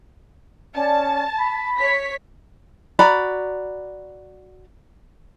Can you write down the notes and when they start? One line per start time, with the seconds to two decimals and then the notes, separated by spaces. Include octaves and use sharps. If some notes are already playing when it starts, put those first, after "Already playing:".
0.75 C#4 D5 A5
1.37 B5
1.77 C#5 B6
2.99 F#4 D5 A#5 B5